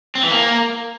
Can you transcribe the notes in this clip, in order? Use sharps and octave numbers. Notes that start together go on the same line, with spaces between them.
C4
E3
A#3